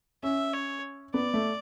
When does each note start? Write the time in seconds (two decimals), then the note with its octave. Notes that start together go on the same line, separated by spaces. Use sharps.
0.23 C#4 E5
0.53 C#5
1.13 B3 D5
1.34 A3